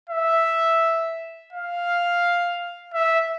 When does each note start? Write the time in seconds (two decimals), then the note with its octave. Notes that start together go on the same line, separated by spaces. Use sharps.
0.10 E5
1.53 F5
2.94 E5